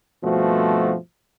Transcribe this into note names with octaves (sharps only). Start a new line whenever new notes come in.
G2 B2 F3 A3 C4 F#4